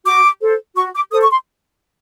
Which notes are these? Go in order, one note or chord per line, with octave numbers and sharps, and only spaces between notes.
F#4 D6
A4 C5
F#4 C#6
D6
A4 C5 D#6
C#6
C6